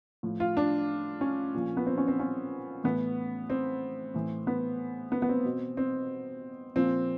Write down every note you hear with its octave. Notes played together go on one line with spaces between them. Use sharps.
A2 F3
F4
D4
C#4
A#2 F3
B3
C4
C#4
C4
C#4
A2 E3 B3
C4
A2 E3
B3
B3
B3
C4
B2
C4
A#2 F3 C4